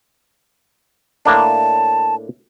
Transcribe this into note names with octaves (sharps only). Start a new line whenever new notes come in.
A2 A#3 D4 A5